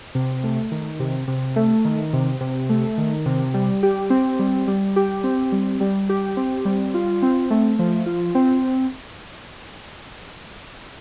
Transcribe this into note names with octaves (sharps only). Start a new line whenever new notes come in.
C3
A3
D#3
C3
C3
A3
D#3
C3
C3
A3
D#3
C3
G3
G4
C4
G3
G3
G4
C4
G3
G3
G4
C4
G3
F4
C4
A3
F3
F4
C4